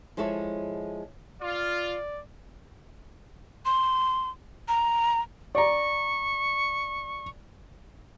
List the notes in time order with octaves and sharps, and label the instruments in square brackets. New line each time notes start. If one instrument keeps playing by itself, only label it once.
[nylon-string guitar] F3 G#3 E4 A4 C#5
[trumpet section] F4 [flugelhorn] D5
[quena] C6
A#5
[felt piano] D5 A#5 [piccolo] C#6